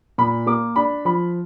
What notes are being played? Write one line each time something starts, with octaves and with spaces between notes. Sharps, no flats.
A#2 B5
A#3 D6
D4 B5
F3 B5